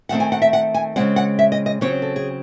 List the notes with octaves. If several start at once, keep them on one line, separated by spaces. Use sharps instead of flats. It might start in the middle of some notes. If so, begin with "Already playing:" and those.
D#3 A3 C4 F#5
G#5
F#5
E5
F#5
G#5
C#3 G#3 C4 F#5
F#5
E5
D#5
D#5
C#3 F#3 C4 C#5
A4
G#4